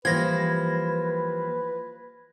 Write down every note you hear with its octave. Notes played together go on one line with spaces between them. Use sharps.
E3 F3 G3 A#3 B4 G#6 A#6